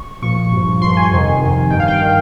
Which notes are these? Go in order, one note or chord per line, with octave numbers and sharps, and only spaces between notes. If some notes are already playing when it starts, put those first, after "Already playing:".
Already playing: C#6
A#2 F3 C#6
G2 F3
G2 F3 C6
G#5
F2 C3 D#3
F2 C3 D#3
G2 D#3 G5
F5
G5
D#3